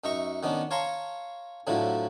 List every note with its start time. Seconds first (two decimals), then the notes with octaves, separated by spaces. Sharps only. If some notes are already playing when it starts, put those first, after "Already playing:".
0.04 F#2 D#4 E5 A#5 C#6
0.43 D#3 B3 C#4 D4
0.71 C#5 F5 A5 A#5 C6 C#6
1.67 A2 D3 F3 F#3 E4